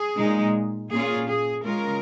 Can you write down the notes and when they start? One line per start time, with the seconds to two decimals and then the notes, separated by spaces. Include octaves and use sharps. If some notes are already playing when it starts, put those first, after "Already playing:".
Already playing: G#4
0.17 A#2 G#3 D#4
0.91 A#2 A#3 C#4 F4 G#4
1.28 G#4
1.65 C#3 G#3 C#4 F4 A#4